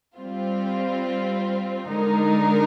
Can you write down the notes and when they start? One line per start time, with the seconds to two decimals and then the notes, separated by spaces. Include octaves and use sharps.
0.16 G3 C4 F4
1.86 D3 G#3 D#4 A#4